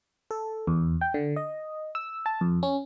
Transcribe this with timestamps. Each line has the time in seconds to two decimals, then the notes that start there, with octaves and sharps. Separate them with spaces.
0.31 A4
0.67 E2
1.01 G5
1.14 D3
1.36 D#5
1.95 E6
2.26 A5
2.41 F2
2.63 C#4